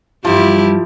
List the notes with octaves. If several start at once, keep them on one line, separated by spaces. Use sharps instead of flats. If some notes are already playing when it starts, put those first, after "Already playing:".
G2 E3 F3 E4 G4